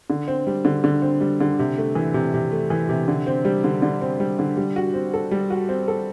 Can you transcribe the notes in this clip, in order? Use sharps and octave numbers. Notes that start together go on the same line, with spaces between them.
D3
C4
G3
D3
D3
C4
G3
D3
C3
A3
E3
C3
C3
A3
E3
C3
D3
C4
G3
D3
D3
C4
G3
D3
G3
F#4
C4
A4
G3
F#4
C4
A4